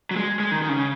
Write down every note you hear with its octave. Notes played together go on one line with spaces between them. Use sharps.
F#3
G#3
G#3
D#3
D#3
C#3